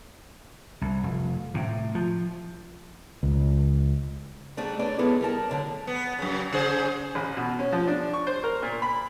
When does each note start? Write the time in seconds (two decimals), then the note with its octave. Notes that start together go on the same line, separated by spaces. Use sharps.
0.82 C2
1.03 F1
1.54 A2 C3
1.95 F3
3.23 C#2
4.57 G#2 G3 A3 D4
4.79 C#4 D4 B4 D5
4.99 F#2 G#3 B3 E4 A4
5.21 G3 A#4 A5
5.49 A2 D3 F#3
5.87 B3
6.18 F#2 C#3
6.53 C#3 G#4 C5
7.15 A1
7.37 B2
7.59 C#4
7.72 F3
7.88 D4
8.14 C#6
8.27 C5
8.44 A#4
8.63 A#2
8.82 B5